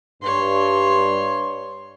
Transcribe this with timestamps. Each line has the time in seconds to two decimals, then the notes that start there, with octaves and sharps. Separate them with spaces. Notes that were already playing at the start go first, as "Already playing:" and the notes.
0.22 G2 C#5 C6